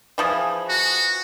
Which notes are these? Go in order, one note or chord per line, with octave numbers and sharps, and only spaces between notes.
E3 F3 G#4
F#4